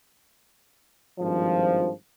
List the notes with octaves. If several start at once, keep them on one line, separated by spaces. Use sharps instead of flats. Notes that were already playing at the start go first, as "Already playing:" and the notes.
G#1 G2 F3